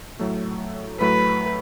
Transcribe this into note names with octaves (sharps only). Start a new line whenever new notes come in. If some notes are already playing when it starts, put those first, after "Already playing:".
A2 F#3 A3
A2 F#3 A3 B4